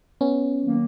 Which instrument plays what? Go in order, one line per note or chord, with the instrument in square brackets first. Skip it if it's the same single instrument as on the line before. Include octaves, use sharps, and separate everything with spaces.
[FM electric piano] B3 C#4
[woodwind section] D#3 F#3 A#3